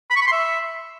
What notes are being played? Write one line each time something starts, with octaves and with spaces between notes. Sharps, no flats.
B5
C#6
B5
C6
E5